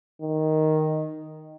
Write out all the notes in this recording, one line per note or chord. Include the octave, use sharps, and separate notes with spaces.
D#3